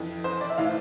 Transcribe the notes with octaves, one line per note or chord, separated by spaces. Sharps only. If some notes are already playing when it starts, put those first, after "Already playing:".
Already playing: F2 E3
C5
D5
E5
A2 E3 F5